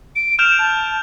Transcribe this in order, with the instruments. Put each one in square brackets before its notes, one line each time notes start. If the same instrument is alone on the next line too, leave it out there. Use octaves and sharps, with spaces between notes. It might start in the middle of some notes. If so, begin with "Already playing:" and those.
[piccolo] D7
[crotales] F6 G6 F7 [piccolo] E7
[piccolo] A5